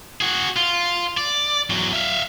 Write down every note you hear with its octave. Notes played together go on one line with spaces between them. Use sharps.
F#4 G#4
F4
D5
E2 F#3
E5 F5